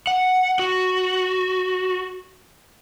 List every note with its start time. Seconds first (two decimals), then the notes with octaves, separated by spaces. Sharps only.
0.07 F#5
0.59 F#4